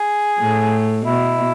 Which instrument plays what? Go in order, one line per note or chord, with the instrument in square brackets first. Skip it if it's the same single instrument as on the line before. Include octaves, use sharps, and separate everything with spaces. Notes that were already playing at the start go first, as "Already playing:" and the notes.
Already playing: [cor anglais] G#4
[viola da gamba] A2
[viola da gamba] B2 [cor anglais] E4